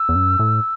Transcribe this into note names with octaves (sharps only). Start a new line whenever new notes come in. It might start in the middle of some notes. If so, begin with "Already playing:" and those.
Already playing: E6
E2
F#2
A2